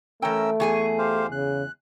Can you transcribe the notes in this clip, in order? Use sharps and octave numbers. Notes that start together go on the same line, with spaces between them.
E3 A3 C#4 A#4 G5 E6
E2 G#4 G#5 C#6
G4 C5 F5
C#3 F#6